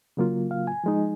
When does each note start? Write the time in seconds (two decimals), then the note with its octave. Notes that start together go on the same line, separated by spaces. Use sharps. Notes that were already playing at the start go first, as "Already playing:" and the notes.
0.17 C#3 F#3 A#3 F4
0.51 F5
0.67 G#5
0.84 F3 G#3 D#4